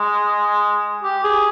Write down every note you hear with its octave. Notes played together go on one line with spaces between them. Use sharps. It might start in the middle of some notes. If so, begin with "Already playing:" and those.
Already playing: G#3
G4
G#4